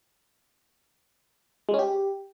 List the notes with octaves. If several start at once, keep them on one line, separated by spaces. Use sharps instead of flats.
G#3
C#4
G4